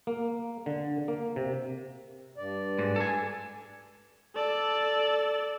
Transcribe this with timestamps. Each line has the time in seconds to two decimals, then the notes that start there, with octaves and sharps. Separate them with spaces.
0.07 A#3
0.66 D3
1.08 A#3
1.36 C3
2.37 G2 D5
2.79 G#2
2.96 A4 G#5
4.36 A4 D5